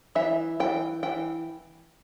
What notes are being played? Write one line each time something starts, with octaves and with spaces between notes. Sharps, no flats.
E3 E5
E3 G5
E3 G5